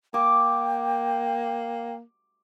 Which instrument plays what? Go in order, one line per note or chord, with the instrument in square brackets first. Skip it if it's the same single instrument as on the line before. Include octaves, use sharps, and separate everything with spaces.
[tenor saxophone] A#3 [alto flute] G5 [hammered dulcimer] D6